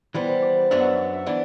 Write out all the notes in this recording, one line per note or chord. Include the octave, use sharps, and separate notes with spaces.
E3 G3 B3 C5
C5
D5
F#2 F#3 B3 D4 E5
F#5
E5
D5
E5
E3 B3 D4